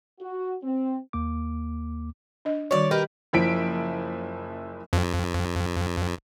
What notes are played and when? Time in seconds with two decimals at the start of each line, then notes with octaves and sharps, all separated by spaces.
0.21 F#4
0.63 C4
1.13 D#2 A#3 D6
2.45 D4 D#5
2.71 D#3 G3 F#4 C#5 D5
2.91 G4 A#4 B4 D#5
3.33 F#1 F3 E4 B6 D7
4.93 F2